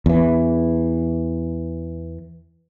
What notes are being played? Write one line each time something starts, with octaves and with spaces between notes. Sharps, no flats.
E2 E3